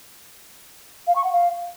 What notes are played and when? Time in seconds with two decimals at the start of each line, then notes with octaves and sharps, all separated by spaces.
1.07 F5
1.15 C#6
1.24 F#5
1.32 F5